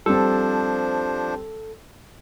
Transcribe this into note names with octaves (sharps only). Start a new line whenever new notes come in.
F3 G3 C4 D4 A4 C5